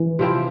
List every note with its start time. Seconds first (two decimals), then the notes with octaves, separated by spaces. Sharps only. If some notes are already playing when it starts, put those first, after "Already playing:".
Already playing: E3
0.19 C3 F3 C4 E4